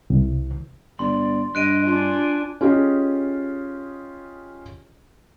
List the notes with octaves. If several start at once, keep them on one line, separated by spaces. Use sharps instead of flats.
C2
G1 D5 C6
G2 D#5 F#6 D7 D#7
D4 F4 G#5
C#4 F4 G4 G#4 D#5